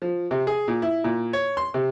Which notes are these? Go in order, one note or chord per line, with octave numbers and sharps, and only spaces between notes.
F3
C3
G#4
A#2
E4
A#2
C#5
C6
C3